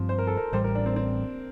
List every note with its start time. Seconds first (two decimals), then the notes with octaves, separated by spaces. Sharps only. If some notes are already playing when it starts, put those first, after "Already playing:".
Already playing: G2 F3 C4
0.09 C5
0.18 A#4
0.27 A4
0.37 A#4
0.53 A1 A2 G3 C5
0.64 A#4
0.75 D4
0.86 C4
0.96 C4